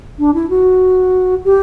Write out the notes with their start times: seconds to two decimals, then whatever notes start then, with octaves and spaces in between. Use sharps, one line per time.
0.19 D4
0.34 E4
0.49 F#4
1.45 G4